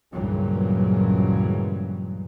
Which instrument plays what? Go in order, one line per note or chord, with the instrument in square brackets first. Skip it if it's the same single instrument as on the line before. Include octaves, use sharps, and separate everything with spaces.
[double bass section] C#2 G2 A#2 C#3 E3 F#3